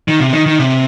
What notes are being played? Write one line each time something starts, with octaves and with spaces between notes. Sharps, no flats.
D#3
C3
D#3
D#3
C3